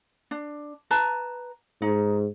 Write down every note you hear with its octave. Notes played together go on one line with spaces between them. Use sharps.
D4
B4 A5 A#5
G#2 D#4